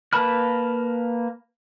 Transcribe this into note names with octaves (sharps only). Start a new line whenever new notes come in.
A#3 B4 A5 B5 F6